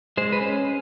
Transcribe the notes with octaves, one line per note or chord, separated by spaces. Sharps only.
G#3 C5
B4
C#4 C5